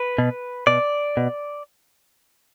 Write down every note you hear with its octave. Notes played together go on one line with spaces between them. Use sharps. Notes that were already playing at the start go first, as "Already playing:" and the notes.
Already playing: B4
B2
B2 D5
B2